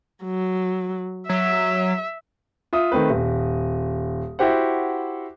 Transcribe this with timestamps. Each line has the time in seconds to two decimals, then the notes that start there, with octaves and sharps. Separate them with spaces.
0.24 F#3
1.29 F#3 E5
2.73 F4 E5 D#6
2.92 D#3 A3 C4 B4
3.10 D#1
4.39 E4 F#4 G4 C5 F#5